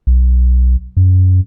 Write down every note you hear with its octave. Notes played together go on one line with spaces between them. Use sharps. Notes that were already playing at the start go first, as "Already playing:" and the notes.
B1
F#2